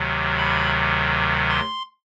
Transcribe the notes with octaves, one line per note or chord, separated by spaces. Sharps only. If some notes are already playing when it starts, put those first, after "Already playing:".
Already playing: D2 C3 D#3 F#3
B5
C6